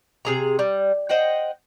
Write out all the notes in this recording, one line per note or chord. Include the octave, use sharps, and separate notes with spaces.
C3 G#4 A#5
G3
C5 D#5 F#5 G5